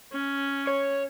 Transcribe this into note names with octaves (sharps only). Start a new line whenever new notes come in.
C#4
C#5